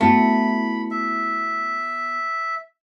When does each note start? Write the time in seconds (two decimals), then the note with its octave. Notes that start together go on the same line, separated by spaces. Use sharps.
0.01 A3 B3 E4 F#4 B5
0.91 E5